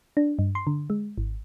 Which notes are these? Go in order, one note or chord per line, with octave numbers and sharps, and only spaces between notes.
D4
G2
C6
D3
G#3
G#1